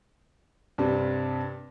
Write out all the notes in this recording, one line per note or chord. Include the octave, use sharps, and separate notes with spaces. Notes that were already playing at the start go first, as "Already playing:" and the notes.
G2 C3 G3